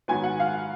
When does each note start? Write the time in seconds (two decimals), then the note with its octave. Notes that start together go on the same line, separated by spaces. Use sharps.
0.08 G#2 D#3 F#3 B3 G#5
0.24 F#5
0.40 F5